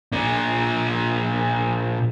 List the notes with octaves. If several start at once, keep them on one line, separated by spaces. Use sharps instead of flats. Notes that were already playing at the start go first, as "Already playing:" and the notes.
A#2 D4